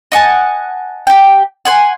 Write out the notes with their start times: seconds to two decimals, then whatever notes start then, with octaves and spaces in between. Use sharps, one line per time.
0.12 D#5 F#5 G#5 A5
1.07 G4 G5
1.65 F#5 G#5 C6